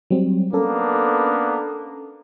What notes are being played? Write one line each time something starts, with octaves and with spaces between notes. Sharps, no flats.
F#3 G3 C4
A#3 B3 C#4 D4 A4